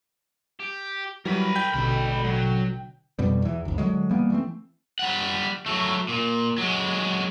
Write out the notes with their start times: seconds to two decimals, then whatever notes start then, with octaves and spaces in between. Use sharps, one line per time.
0.60 G4
1.25 E3 F#3 G3 A#4 B5
1.56 G5 G6 B6
1.73 A1 B2 D3 G#3 B5
2.24 F#3
3.19 F2 B2 G3
3.42 E2 E3
3.65 G1 D2
3.78 D3 F#3 G#3
4.10 E3 G3 A#3 B3
4.30 E3 A3 C4
4.99 G3 F#5
5.66 F#3 A3
6.09 A#2
6.58 F#3 G#3